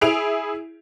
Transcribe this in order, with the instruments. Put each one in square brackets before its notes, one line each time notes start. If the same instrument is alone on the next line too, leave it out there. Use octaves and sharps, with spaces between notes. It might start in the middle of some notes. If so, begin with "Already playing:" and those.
[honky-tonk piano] E4 G#4 D7 F7